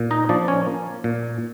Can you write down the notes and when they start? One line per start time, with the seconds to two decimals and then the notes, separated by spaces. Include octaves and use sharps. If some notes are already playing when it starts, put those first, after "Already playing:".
Already playing: A#2
0.11 D#4 D#5
0.29 F3 D4 D5
0.48 C#4 C#5
0.66 A#3
1.04 A#2